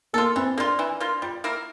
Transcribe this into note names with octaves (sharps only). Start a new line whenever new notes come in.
A#3 F4 A4
E3 C4
A#3 D4 F4
E3
A#3 F4
G3 F4
A#3 E4 A#4